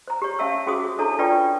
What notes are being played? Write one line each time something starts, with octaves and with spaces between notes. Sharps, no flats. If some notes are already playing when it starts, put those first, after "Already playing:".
C5 A#5
G4 C#5
C#4 G4 E5 F5 A5 E6
C#4 F#4 G#4 C5 D#6
D4 E4 A4 C#5 A5 A#5
D4 F4 B4 D5 G5 C#6